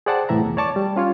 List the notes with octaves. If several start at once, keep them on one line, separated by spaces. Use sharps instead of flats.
G#4 C5 D5 F#5 G5 A5
C2 A2 E3 E5 A#5
E2
C#5 D5 A5 C#6 D6
G3
C#4 F4 C#5